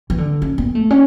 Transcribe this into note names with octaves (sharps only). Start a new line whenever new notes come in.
E3
D3
C#4
B3
A3
C#4